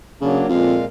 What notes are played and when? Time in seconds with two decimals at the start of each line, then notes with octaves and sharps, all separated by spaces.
0.21 C#3 F#3 A#3 D4
0.49 F2 A#2 G#3 F5